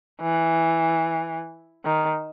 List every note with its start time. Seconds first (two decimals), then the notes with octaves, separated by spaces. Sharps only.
0.21 E3
1.85 D#3